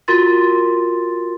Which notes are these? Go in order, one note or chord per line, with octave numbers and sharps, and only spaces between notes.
F4 F#4 A#4 C6 A6